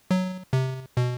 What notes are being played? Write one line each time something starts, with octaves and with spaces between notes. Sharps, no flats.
F#3
C3
B2